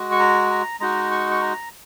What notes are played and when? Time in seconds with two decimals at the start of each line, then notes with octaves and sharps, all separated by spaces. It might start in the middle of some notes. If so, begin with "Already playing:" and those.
Already playing: G#3 F#4
0.11 C#6
0.19 A#5
0.50 A#5
0.80 G#3 D#4 F#4 A#5
1.11 C#6
1.31 C#6
1.41 A#5